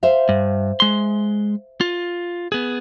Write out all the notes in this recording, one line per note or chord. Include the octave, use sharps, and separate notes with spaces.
C5 E5 F5
G2
G#3 C6
F4
B3 G#4